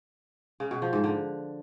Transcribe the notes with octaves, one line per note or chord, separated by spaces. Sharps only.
C#3
B2
F3
G#2
D3